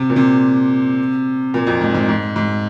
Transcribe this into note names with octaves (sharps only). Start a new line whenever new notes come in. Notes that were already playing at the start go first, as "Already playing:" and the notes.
Already playing: C3
A#2
C3
A#2
F2
G#2
G#2
G#2
G#2